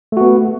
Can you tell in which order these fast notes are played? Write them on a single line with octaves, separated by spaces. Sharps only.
A3 F#4 B3